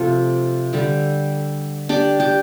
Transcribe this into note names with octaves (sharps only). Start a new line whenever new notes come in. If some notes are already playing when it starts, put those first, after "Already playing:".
Already playing: C3 F3 A3 F4 A4
D3 G3
D4 G4
G4